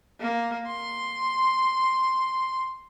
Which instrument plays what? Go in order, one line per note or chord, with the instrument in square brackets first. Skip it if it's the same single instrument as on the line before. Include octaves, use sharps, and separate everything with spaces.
[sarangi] A#3
C6